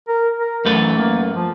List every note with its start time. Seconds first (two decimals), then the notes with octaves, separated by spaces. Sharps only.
0.08 A#4
0.40 A#4
0.65 F#2 E3 A3 B4
0.97 A#3
1.34 F3